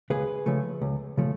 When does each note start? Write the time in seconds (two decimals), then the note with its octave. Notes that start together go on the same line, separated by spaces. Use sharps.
0.10 C#2 G#4 B4
0.46 C#3 F3 A3
0.82 C#2
1.17 C#3 F3 A3